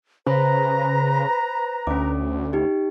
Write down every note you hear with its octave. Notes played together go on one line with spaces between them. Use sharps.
C#3 B4 C5 A#5 B5
D2 C#4 D6
D#4 G4